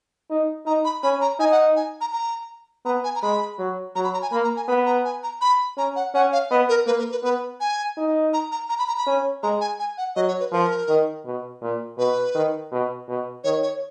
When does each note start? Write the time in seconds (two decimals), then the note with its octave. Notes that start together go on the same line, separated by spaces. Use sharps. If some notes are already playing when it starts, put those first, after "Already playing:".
0.30 D#4
0.66 D#4 A#5
0.85 B5
1.03 C#4 B5
1.21 A#5
1.39 D#4 G#5
1.52 F#5
1.76 G#5
2.01 A#5
2.13 A#5
2.85 B3 A#5
3.04 G#5
3.15 A#5
3.22 G#3 B5
3.59 F#3
3.95 F#3 A#5
4.04 B5
4.14 A#5
4.22 G#5
4.32 A#3 B5
4.44 A#5
4.56 G#5
4.68 B3 B5
4.86 A#5
5.05 G#5
5.23 A#5
5.41 B5
5.77 C#4 A#5
5.96 F#5
6.14 C#4 F#5
6.33 F5
6.51 B3 D#5
6.69 A#4
6.87 A#3 B4
6.99 A#4
7.11 B4
7.23 B3 B4
7.61 G#5
7.97 D#4
8.33 A#5
8.52 A#5
8.69 A#5
8.79 B5
8.88 A#5
8.97 B5
9.06 C#4
9.43 G#3 A#5
9.61 G#5
9.79 G#5
9.98 F#5
10.16 F#3 D#5
10.28 C#5
10.40 B4
10.52 F3 A#4
10.89 D#3
11.25 B2
11.62 A#2
11.98 B2 B4
12.35 D#3
12.72 B2
13.08 B2
13.44 D#3 C#5
13.63 C#5